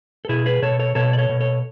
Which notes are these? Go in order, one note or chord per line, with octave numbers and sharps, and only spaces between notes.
A4
B2 E4 G#4
G#4 B4
B2 A4 C#5
A4 C#5
B2 A4 C#5
D5
A4 C#5
B2
A4 C#5